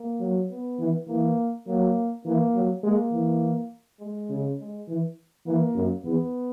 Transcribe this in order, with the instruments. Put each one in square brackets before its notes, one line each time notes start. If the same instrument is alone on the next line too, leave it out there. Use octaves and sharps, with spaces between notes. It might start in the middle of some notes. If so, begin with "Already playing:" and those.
Already playing: [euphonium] A#3
[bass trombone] F#3
[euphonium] B3
[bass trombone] E3
[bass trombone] E3 [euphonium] A#3
[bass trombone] F#3 [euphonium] A#3
[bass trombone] E3 [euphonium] A#3
[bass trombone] F#3
[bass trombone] G#3 [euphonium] A#3
[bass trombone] E3
[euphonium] G#3
[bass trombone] C#3
[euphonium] G#3
[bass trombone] E3
[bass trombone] E3 [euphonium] A#3
[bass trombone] F#2
[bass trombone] E2 [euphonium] B3